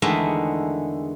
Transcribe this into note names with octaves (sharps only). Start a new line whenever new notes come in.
E2 D3 D#3 G#3 A3 E5